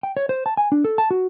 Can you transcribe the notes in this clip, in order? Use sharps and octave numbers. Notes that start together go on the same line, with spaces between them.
G5
C#5
C5
A5
G#5
D4
A4
A5
F#4